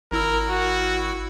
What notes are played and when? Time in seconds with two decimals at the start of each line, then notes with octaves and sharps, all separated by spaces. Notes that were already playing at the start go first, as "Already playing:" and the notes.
0.12 G#1 E4 A#4 E6
0.49 F#4